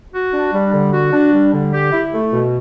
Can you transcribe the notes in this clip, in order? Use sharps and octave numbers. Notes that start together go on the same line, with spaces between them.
F#4
D4
G3
D3
F#4
D4
G3
D3
G4
E4
A3
B2